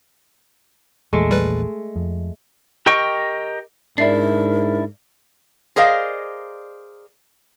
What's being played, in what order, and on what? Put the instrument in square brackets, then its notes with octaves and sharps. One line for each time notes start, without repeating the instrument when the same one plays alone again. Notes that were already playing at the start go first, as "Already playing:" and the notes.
[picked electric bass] A#1 E2 A#2 [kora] G#3 A3
[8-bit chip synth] G3 B4
[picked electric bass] F2
[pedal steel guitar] G4 A#4 D#5 G5 C#6
[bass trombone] G#2 [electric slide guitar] D4 E4 [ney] A#4 [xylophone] D5 E5 C7
[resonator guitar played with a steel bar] G#4 A#4 C5 D5 D#5 F5